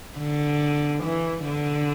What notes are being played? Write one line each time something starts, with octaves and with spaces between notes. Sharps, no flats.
D3
E3
D3